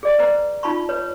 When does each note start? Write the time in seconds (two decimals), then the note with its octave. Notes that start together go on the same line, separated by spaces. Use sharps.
0.03 G#4 D5
0.19 B4 C5 A#5
0.63 D#4 F4 A5 B5 C#6
0.89 B4 C#5